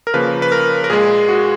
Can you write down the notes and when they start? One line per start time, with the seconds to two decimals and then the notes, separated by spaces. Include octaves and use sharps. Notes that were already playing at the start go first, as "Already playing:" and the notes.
0.07 A#4
0.14 C#3 F3 A#3 B4
0.42 B4
0.52 A#4
0.84 A#4
0.90 A#2 G#3 G#4
1.29 F#4